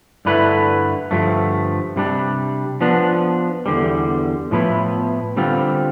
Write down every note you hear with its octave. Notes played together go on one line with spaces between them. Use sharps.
G2 D3 A3 E4 B4
G2 D3 F3 A3
C3 G3 D4
F3 B3 D4
E2 D3 G3
A2 F3 B3 E4
D3 G3 C4 F4